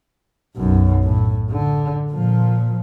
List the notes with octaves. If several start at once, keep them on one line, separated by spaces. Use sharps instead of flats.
B1 F#2
A2
D3
A#2 F3